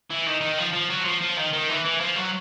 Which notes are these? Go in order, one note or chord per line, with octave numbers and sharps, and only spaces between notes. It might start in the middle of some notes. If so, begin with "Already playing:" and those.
E3
D#3
D#3
F3
F3
F#3
F3
F3
D#3
D#3
E3
E3
F3
F#3